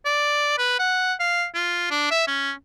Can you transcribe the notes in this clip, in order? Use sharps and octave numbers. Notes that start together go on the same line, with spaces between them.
D5
B4
F#5
F5
F4
D4
E5
C#4